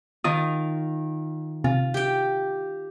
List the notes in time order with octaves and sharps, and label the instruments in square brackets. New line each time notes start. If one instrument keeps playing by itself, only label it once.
[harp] D#3 F4 [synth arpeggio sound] D#6
[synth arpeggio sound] C3 [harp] F4
[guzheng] G4 G5